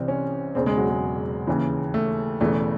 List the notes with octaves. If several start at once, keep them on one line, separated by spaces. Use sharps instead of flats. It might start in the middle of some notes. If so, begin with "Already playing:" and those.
Already playing: C2 C3 E3 C4
C#4
E1 E2 C#3 C4
G#3
F#3
G#3
D#2 C#3 E3
A3
E1 E2 C#3 E3 A3